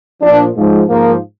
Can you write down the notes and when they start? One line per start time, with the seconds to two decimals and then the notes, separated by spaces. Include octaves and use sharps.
0.22 A#2 F3 D4
0.56 G#2 F3
0.89 G#2 F3 A#3